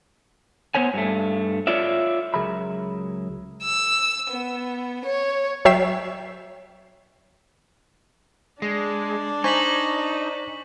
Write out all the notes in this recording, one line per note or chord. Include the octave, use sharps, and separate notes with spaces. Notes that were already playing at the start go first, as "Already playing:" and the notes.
B3 C5 C#5 G#5
G2 A3
F4 C#5 D5 E5
C#2 F#3 G#4 A#4 E5 B5
E6
B3
C#5
F#3 C#5 E5 G5 C7 E7
G#3 D4
D#4 C5 G#5 C#6 B6 F#7